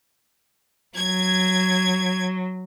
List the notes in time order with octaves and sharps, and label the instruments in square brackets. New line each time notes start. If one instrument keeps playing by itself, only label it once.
[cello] F#3 [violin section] G#6